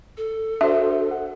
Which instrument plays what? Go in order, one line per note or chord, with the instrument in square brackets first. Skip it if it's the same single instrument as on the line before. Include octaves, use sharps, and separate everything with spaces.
[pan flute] A4
[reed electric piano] D4 F#4 C5 [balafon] E5
[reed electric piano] F#5